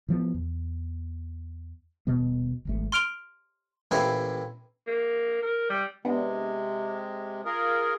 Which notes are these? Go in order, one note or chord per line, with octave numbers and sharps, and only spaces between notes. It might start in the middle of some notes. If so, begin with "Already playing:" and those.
A2 F3 B3
E2
D#1 B2 B3
D1 G#1 A3
C6 F6 D7 F7 G7
A1 A#2 E4 G4 C5 G#5
A#3
A#4
G3
C3 G#3 B3 D4
F4 G#4 A#4